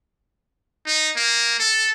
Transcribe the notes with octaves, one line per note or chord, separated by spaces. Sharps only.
D#4
A#3
A4